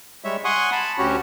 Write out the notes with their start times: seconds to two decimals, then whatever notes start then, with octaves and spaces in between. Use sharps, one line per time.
0.24 G3 G#3 C#5 E5
0.45 F#5 G#5 C6 C#6 D#6
0.72 A5 B5
0.98 D2 C#4 F#4 G4 C#5